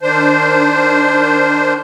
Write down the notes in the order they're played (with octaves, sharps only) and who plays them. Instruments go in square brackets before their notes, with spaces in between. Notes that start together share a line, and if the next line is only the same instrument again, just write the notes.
[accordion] D#3 D4 C5